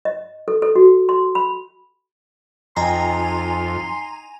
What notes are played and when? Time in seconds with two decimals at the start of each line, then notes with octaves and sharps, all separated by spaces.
0.05 D#5
0.48 A4
0.62 A4
0.75 F#4
1.09 C6
1.35 B5
2.77 F2 D#4 G5 G#5 A#5 C6